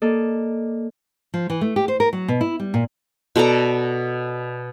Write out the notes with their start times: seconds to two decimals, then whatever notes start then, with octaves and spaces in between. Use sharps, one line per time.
0.02 A#3 A4 D5 D#5
1.34 F3
1.50 E3
1.61 A3
1.76 G4
1.88 C5
2.00 A#4
2.13 F#3
2.28 B2
2.41 E4
2.60 G3
2.74 A#2
3.36 B2 A4 D5 A#5